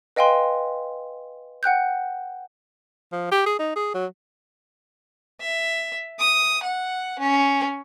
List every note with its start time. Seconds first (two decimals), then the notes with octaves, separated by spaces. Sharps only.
0.16 B4 D#5 F5 G5 G#5 C6
1.63 F#5 G5 F#6 G6
3.12 F3
3.32 G4
3.46 G#4
3.59 D#4
3.76 G#4
3.95 F#3
5.41 E5
6.19 D#6
6.63 F#5
7.19 C#4